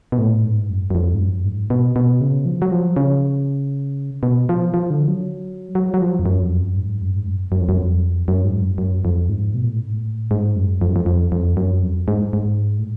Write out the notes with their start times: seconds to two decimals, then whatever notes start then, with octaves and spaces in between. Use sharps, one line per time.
0.12 B2
0.18 A2
0.44 G#2
0.70 F#2
0.90 F#2
0.95 F2
1.15 G#2
1.20 F#2
1.45 G#2
1.70 B2
1.96 B2
2.21 C#3
2.46 F3
2.62 F#3
2.71 F3
2.96 C#3
4.23 B2
4.49 F3
4.74 F3
4.90 D3
5.08 F#3
5.75 F#3
5.94 F#3
6.01 F3
6.19 F2
6.26 F#2
6.42 F2
6.60 F#2
6.77 G#2
7.02 F#2
7.16 G#2
7.26 F#2
7.52 F#2
7.61 F2
7.69 F#2
7.78 F2
8.28 F#2
8.45 G#2
8.62 F#2
8.78 F#2
9.05 F2
9.29 G#2
9.54 B2
9.67 A2
9.79 G#2
9.93 A2
10.31 G#2
10.56 F#2
10.81 F2
10.89 F#2
10.96 F2
11.06 F2
11.32 F2
11.57 F#2
11.83 F2
12.08 G#2
12.33 G#2
12.79 A2